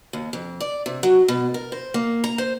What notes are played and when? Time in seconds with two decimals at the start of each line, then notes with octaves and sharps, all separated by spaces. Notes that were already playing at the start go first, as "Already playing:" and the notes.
0.13 D#2
0.33 F2
0.60 D5
0.86 C3
1.03 F#3
1.28 B2
1.54 A#4
1.72 C5
1.94 A#3
2.24 A#5
2.38 C5